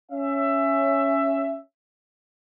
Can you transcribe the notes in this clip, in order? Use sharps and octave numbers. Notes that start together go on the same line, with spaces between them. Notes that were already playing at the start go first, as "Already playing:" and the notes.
C#4 E5